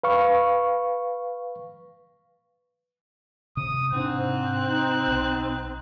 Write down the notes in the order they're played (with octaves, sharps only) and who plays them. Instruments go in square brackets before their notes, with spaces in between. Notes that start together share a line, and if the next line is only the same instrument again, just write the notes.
[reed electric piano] B4 F5 C#6
[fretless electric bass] C3 [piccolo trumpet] D#6
[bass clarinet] G#2 [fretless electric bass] C3 D4 [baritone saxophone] C4 [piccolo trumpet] F#6
[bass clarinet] D#4
[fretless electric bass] B1